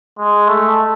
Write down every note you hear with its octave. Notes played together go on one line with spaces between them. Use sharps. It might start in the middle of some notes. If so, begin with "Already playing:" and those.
G#3
A3